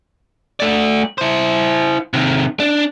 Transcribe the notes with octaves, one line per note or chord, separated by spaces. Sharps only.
A3 D5
E4 C5
C3 D#3
D4